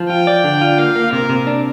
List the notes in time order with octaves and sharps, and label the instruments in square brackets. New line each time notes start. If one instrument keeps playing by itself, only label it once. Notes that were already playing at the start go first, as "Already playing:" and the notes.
Already playing: [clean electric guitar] F3
[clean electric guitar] F4 [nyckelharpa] G5
[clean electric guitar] D5
D3
F4
[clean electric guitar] A#3 [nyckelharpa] F5
[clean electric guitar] A#3
[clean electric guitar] C3 [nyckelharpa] A#4
[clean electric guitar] C3
D4